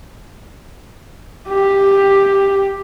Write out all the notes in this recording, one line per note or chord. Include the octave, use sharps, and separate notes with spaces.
G4